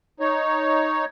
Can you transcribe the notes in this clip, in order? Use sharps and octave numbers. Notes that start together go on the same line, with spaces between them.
D#4 C#5